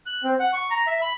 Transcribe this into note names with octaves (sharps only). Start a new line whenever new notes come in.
F#6
C4
F#5
C#6
A#5
E5
B5